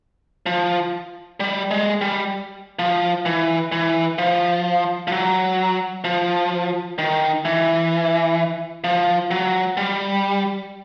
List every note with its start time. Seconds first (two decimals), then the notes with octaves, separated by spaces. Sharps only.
0.46 F3
1.40 G3
1.71 G#3
2.01 G3
2.79 F3
3.25 E3
3.72 E3
4.18 F3
5.08 F3
5.12 F#3
6.04 F3
6.98 D#3
7.45 E3
8.84 F3
9.31 F#3
9.77 G3